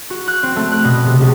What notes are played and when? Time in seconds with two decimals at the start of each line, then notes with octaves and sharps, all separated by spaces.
0.10 F#4
0.28 F#6
0.43 C4
0.56 A3
0.72 F#6
0.84 B2
1.06 C3
1.21 C#2